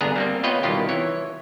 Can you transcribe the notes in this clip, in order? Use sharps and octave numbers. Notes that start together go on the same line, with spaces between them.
G1 B3 D4 G#4 A#5
G3 A#3 C4
B3 F4 B4 C#5 D#5 G5
C2 B2 D#3 F4 G4
E3 C#5